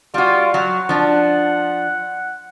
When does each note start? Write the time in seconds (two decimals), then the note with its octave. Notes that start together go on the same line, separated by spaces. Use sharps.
0.14 G3 F4 F#4
0.54 F#3 F#5
0.89 F3 D4